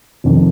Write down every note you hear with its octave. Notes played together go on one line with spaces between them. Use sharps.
F1 F2 D#3